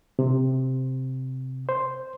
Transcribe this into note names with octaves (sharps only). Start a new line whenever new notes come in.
C3
C5